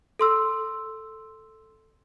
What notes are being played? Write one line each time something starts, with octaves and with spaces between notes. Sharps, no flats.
A4 C6 E6